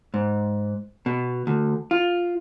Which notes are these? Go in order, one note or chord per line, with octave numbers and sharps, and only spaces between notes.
G#2
B2
D2
F4